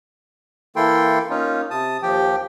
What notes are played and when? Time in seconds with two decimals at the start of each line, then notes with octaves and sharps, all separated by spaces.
0.76 E3 A#3 E4 A4 G5 C6
1.30 A#3 C#4 D#4 F4
1.71 C3 A5 D#6
2.02 D#2 F3 G4 G5